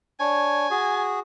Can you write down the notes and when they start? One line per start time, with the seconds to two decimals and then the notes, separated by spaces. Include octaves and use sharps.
0.20 D4 C#5 G#5
0.70 F#4 G#4